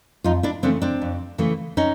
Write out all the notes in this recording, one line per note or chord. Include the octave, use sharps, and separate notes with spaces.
F2 D#4 F4
D4 E4
C#3 E3 A3 C4 D4
C4 D4
F2
C#3 E3 A3
C#4 D#4